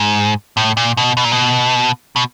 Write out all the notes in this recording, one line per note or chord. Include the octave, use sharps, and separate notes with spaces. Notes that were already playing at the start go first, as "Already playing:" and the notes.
Already playing: G#2
A2
A#2
B2
B2
A#2
B2
B2